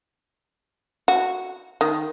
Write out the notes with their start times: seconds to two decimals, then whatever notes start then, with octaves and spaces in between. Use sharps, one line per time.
1.08 F#4
1.81 D#3